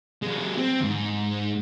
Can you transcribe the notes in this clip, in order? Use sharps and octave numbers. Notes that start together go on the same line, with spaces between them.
F#3 G#3
C4
D#2 G#2